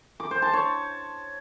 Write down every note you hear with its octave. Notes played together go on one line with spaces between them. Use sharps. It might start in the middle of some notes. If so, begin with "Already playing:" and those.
D6
C5
A5
C#5